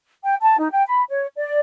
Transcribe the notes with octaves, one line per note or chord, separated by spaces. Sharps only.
G5
A5
D#4
G5
B5
C#5
D5